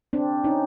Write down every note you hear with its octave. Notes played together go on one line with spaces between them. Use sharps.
C4 D4
C#4 D#4